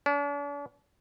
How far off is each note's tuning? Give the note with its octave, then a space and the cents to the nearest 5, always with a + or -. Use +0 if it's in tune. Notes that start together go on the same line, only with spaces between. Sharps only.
D4 -45